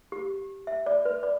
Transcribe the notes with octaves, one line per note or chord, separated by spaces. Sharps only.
G4
E5
D5
B4
D5